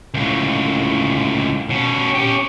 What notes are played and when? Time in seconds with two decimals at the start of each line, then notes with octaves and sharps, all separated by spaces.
0.14 C#2 A2
1.70 B2 C#4
2.15 C#4 G4